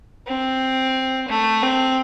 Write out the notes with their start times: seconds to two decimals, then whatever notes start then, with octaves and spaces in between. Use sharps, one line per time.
0.27 C4
1.29 A3
1.63 C4